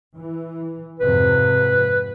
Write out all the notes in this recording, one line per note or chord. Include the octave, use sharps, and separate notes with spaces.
E3
F2 G#2 C3 B4